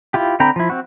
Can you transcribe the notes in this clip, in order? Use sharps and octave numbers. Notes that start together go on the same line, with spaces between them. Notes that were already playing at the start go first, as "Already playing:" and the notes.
E4 F4 G4
D3 C4 G5 A#5 B5
F3 E4
C4 F#4